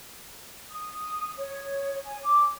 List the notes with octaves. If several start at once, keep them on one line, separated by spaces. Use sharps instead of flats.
D#6
C#5
G#5
D6